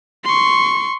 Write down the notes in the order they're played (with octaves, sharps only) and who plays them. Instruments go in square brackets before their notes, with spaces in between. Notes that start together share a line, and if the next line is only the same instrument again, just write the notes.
[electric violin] C6 C#6